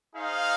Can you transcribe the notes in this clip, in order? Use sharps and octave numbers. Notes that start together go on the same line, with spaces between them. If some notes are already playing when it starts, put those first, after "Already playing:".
D#4 G#4 C5 F5